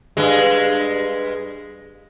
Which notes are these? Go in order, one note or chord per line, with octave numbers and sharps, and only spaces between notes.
G2 G#3